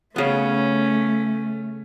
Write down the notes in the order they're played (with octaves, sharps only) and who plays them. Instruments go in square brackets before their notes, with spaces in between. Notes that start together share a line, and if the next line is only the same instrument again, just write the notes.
[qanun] C#3 B3 [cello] A3 [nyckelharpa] C#4